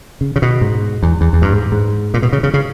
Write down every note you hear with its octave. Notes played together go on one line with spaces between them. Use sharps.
C#3
C#3
B2
G#2
E2
E2
E2
G2
G#2
G#2
A#2
B2
C#3
C#3
C#3